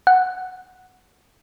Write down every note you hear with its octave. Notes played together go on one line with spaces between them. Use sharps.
F#5